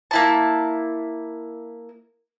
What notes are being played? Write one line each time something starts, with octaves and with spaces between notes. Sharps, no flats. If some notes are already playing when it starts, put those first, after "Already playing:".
A#3 E4 A5